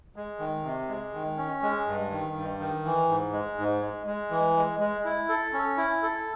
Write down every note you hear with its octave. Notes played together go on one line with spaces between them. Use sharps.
G#3
D#3
C3
G#3
D#3
C#4
G#3
G2
D#3
G2
D#3
E3
G#2
G#3
G#2
G#3
G#3
E3
G#3
G#3
E4
A4
C#4
E4
A4